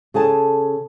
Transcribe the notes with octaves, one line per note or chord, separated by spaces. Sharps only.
C#3 G#4 A4 G#5 A5